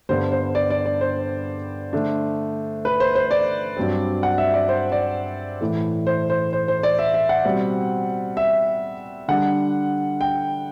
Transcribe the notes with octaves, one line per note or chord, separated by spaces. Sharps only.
G2 D3 G3 B3 C5
C5
D5
D5
D5
C5
D3 A3 D4
B4
C5
C5
D5
G2 F#3 C4
F#5
E5
D5
C5
D5
A2 E3 A3
C5
C5
C5
C5
D5
E5
E5
F#5
B2 G3 C4
E5
D3 G3 D4 F#5
G5